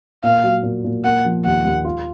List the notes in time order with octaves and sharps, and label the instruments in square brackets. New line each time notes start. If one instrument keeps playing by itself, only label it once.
[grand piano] A#2 [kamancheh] F5
[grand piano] F#3
A#2
A#2
[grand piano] A#3 [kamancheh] F#5
[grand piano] F3
[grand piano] D#2 [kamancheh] F#5
[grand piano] D#2
F4